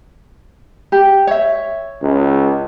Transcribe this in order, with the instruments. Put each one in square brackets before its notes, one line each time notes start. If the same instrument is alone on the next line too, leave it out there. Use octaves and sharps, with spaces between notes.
[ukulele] G4
C#5 E5
[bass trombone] C#2